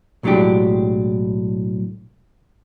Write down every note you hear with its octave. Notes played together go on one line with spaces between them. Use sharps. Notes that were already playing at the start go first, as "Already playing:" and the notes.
B1 A2 F#3 G#3 D4 G4